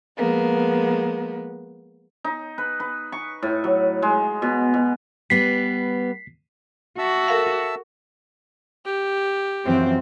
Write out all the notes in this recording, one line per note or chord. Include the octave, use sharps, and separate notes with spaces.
F3 G#3 A#3 B3
D#4
B4
B4
C#6
A2
F#3
G#3
B2
B2
G3 B3 B4 B6 C7
F#4 E5 A5 E6
A4 A#4 F5
G4
F#2 E3 F3 C4